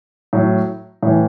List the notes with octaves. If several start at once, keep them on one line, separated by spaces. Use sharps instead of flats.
A2 F#3
A2 E3